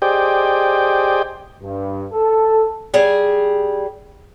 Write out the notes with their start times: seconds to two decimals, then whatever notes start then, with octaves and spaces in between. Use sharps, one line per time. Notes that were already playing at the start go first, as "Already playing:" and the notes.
0.02 G4 G#4 C5 D5 D#5 G5
1.62 G2
2.13 A4
2.94 G3 G#4